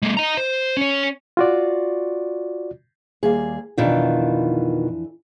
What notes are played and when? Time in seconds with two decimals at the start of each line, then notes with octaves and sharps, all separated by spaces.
0.02 G#3 A#3
0.17 D#5 A#5
0.37 C5
0.77 C#4 C#5
1.37 F4 F#4 D5
3.23 D#2 G3 G#4 F5
3.78 F2 B2 D#3 E3 D4 F4